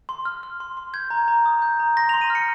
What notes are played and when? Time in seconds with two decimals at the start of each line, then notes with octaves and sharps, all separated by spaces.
0.09 C6
0.25 F6
0.43 F6
0.60 C6
0.77 C6
0.94 G6 G#6
1.10 A#5
1.28 A#5
1.46 D#6
1.62 G6
1.80 A#5
1.96 C6 A#6
2.09 C6 F7
2.21 D#7
2.30 F6
2.35 C#7